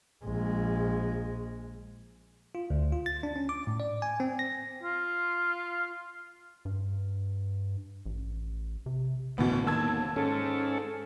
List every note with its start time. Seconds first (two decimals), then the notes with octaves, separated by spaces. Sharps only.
0.25 A#1 G#3
2.55 F4
2.70 D2
2.92 F4
3.06 A6
3.23 D4
3.36 C#4
3.49 D6
3.67 A2
3.80 D5
4.02 G#5
4.20 C4
4.39 A#6
4.83 F4
6.65 G2
8.06 A1
8.86 C3
9.38 D1 A1 D2 B2 E3 B3
9.67 E1 D#3 A#3 A5 E6 G#6
10.16 G#2 C#4 A4